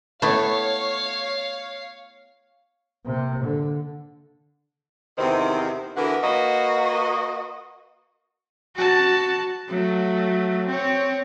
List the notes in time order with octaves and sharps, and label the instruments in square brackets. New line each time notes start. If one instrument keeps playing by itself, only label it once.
[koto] A3 B3 E4 [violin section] C#5 F5
[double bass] C3 A#3
D3
[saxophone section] E2 C3 D#3 C4 D#4 E4
D3 E3 B3 F#4 A#4
A#3 F#4 B4 D#5
[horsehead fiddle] F#4 A5
F#3 A3
C4 C#5